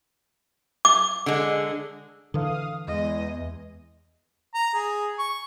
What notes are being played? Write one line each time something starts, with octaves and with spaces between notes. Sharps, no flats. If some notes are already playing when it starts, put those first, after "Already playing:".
D6
D3 G#3
D3 E3 F5 D#6
E2 G#3 D#5
A#5
G#4
C#6